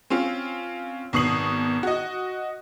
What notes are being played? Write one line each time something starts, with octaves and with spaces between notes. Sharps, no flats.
C4 C#4 F4
G#1 B2 C#6 D#6 C7 F#7
F#4 D#5